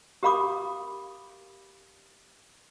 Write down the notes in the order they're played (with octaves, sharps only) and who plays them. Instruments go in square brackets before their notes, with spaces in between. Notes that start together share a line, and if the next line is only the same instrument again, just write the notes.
[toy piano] G4 A#4 F5 B5 D6 D#6